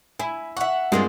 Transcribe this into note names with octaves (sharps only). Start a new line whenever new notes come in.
E4 G#5
E5 F#5 C#6
G2 G#3 A#3 C4 F4 G#4